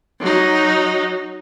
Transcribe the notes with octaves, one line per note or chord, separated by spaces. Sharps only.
F#3 D#4